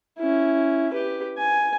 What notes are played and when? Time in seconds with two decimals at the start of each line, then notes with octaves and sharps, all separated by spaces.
0.19 C#4 E4
0.93 G4 B4
1.38 G#5